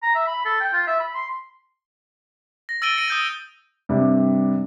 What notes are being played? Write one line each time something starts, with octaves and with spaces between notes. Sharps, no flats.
A#5
E5
B5
A4
G5
F4
E5
B5
C6
A#6
E6 A6 D7 D#7 G7
A#6 C#7 D#7
D#6 G6 A6
G2 C3 G3